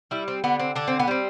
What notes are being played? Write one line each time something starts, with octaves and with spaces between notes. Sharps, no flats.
G3 E4
C4
D3 B3
C4
D3 D4
C4
B3
G3 C4